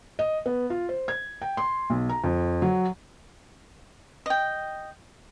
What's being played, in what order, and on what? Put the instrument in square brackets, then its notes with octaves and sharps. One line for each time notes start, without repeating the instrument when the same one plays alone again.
[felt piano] D#5
B3
F4
C5
G#6
G5
C6
B1
A#5
F2
F#3
[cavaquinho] D#5 G5